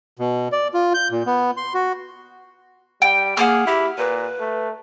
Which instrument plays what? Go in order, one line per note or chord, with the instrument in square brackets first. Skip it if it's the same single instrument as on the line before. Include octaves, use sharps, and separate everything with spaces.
[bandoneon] B2
D5
F4
G6
A#2
B3
C6
F#4
[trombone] G3 [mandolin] G5
[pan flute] A#3 [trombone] G#4 [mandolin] F#5 D6 F6
[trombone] E4 [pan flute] G4
[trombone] A#2 [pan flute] B4
[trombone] A3